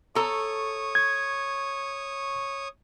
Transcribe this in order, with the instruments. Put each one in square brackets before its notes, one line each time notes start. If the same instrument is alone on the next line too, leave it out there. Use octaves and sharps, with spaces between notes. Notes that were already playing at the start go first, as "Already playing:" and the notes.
[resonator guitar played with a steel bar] A4 A#5 [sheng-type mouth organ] C#5 C#6 D#6
[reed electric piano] G#6